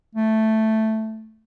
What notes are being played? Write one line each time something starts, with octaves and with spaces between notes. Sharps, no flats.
A3